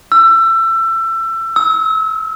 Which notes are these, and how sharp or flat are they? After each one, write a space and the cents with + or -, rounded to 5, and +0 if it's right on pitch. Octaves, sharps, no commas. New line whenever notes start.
E6 +25
E6 -35